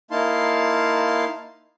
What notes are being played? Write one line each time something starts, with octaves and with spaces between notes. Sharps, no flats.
A#3 D#4 E4 F5 A5 C6